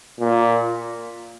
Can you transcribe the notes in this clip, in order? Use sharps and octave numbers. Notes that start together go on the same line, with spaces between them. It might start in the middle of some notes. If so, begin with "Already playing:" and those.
A#2